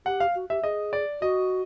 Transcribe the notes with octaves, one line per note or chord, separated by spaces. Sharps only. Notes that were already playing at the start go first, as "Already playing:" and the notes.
G4 F#5
F5
F#4
G4 E5
G#4 D#5
D5
F#4 D#5